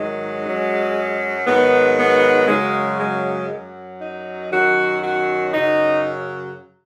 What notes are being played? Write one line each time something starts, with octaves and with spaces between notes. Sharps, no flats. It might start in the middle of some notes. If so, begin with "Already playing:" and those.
Already playing: G#2 D#3 F#3 G#3
F#2 F#3
G#2 D#3 F#3 B3
B3
F#2 C#3 F#3 G#3
G#3
F#2 F#3
D#4
F#2 D#3 F#3 F#4
F#4
F#2 C#3 F#3 D#4